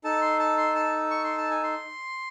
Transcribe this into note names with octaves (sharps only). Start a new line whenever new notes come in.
D#4 A4 A5
C6
A5
C6
A5
C#6
C6
A5
G#5
C6